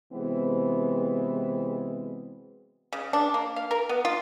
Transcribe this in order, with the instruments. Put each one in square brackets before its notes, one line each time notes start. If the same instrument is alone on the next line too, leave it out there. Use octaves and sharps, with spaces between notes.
[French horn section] C3 E3 F#3 G#3 B3 C4
[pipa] C#3
D4
A#3
F5
A#4
B3
F4